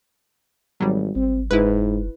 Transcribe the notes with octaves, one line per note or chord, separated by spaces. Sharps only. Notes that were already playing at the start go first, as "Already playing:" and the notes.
G#1 F#3 G3
G#1 C4
F#1 G#2 E4 B4